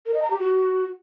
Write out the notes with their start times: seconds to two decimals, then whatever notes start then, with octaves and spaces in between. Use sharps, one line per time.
0.06 A#4
0.14 D#5
0.22 A#5
0.30 G4
0.39 F#4